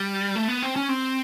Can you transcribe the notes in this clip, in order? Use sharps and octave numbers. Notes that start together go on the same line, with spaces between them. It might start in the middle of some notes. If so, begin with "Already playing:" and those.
Already playing: G3
A3
B3
C4
C#4
C4